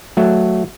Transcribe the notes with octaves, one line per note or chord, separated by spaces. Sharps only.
F#3 A3